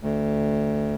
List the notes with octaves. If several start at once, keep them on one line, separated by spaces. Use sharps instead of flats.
D2